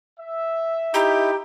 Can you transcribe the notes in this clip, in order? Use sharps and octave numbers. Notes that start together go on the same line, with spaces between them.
E5
D#4 E4 G4